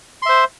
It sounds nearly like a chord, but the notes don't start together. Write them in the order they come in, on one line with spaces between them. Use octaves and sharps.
C6 E5 C5